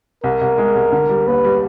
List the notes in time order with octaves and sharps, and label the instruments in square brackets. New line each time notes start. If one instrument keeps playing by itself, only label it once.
[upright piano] C2 [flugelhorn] A#4
[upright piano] C2
G#3
C2
D3
G3
[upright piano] D#2 [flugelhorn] B4
[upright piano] G3